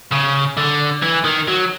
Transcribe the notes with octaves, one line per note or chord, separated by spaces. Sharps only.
C#3
D3
E3
D#3
F#3